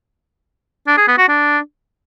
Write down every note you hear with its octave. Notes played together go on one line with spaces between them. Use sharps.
D4
G#4
B3
F#4
D4